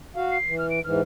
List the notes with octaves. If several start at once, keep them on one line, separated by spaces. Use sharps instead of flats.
F#4 F5
C7
E3
F6
D7
G#2 E3 F6